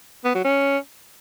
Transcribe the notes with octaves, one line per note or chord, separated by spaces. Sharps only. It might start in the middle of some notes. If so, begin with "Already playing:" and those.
B3
F#3
C#4